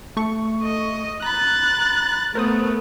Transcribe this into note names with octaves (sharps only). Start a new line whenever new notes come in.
A3 C#6
D#5
A#5 B5 F#6 A6
A3 B3 A#4 C5 D#6